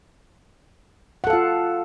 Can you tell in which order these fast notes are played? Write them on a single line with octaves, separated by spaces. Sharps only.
F#5 A4 F5 F4